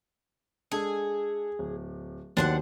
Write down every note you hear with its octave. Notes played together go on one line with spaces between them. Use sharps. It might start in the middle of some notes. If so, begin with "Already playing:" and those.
G#3 D4 G#4 A4
D1
D#2 F#3 B3 D4 C5 F#5